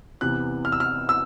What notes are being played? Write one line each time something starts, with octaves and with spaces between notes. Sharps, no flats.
E2 C3 E3 F#6
F6
E6
F6
E6